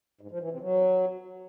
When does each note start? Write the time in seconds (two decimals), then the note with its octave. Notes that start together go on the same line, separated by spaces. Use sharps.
0.21 G#2
0.31 F3
0.41 E3
0.51 C3
0.61 F#3